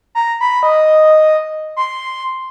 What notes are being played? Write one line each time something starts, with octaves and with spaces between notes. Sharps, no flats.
A#5
B5
D#5
C6